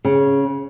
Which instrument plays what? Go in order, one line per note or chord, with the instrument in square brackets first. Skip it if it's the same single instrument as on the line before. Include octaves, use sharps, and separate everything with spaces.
[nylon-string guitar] C#3